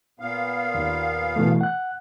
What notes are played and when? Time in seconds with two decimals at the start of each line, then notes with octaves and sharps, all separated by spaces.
0.20 A#2 B3 F5
0.75 D#2
1.36 B2 E3 A3
1.61 F#5 F#6